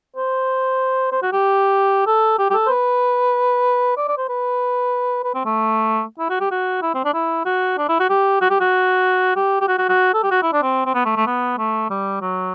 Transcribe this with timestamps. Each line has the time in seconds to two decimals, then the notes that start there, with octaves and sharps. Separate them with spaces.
0.16 C5
1.12 C5
1.22 F#4
1.32 G4
2.07 A4
2.39 G4
2.50 G4
2.54 A4
2.66 C5
2.69 B4
3.97 D5
4.08 D5
4.17 C5
4.29 B4
5.24 B4
5.35 C4
5.45 A3
6.19 E4
6.30 F#4
6.40 G4
6.51 F#4
6.82 E4
6.94 C4
7.05 D4
7.14 E4
7.45 F#4
7.78 D4
7.88 E4
7.99 F#4
8.09 G4
8.41 F#4
8.50 G4
8.60 F#4
9.36 G4
9.61 G4
9.68 F#4
9.78 F#4
9.89 F#4
10.14 A4
10.23 G4
10.31 F#4
10.42 E4
10.53 D4
10.63 C4
10.86 C4
10.94 B3
11.05 A3
11.16 A3
11.26 B3
11.58 A3
11.90 G3
12.21 F#3